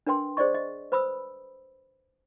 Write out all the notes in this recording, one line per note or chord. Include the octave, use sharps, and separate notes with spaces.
D4 A#4 B4 G5 C6
G#4 C5 D5 D#5 C#6
D#5
B4 C5 B5 D#6 E6